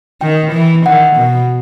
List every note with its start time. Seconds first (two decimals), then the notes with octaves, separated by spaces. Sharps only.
0.21 D#3 G5
0.53 E3
0.85 D#3 F#5
1.17 B2